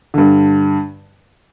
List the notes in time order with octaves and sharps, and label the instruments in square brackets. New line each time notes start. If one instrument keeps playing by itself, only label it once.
[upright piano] G2 D3